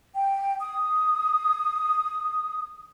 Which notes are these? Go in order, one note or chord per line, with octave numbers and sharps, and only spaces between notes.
G5
D#6